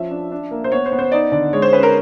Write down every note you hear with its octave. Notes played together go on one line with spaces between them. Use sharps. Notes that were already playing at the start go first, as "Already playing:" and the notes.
Already playing: F3 C#4 E5
D4
D4
A#3
C5
B3 C#5
C5
B3
C5
D#4 D5
D3 D5
G#3 C#5
C5
C#4 B4
A#4